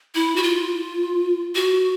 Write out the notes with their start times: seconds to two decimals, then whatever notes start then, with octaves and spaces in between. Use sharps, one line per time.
0.15 E4
0.36 F#4
0.43 F4
1.55 F#4